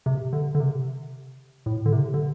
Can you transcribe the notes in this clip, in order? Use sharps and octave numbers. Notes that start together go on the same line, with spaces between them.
C3
D3
D3
C3
A2
D3
C3
D3